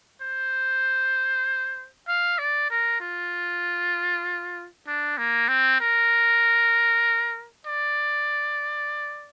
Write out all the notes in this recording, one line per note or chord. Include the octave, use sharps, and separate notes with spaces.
C5
F5
D5
A#4
F4
D4
A#3
C4
A#4
D5